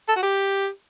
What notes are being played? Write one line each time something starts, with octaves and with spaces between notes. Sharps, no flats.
A4
F#4
G4